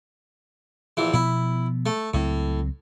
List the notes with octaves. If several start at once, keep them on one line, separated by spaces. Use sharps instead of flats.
A#1 E3
B2 F3 B3 E4
A3
C#2 A2 F#3 C4